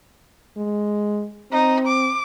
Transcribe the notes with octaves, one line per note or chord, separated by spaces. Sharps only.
G#3
C4 D#4
D6